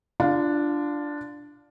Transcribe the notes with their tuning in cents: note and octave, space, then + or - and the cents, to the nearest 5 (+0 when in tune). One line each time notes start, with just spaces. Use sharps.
D4 +0 F4 -30 F5 +20